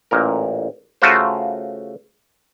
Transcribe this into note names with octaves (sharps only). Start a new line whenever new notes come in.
A1 A#2 A#4
C#3 A3 F4 F#4 A#4 C5